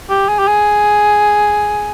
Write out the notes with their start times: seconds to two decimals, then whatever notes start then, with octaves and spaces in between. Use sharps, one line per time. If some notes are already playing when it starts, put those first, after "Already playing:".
0.10 G4
0.29 G#4
0.39 G4
0.48 G#4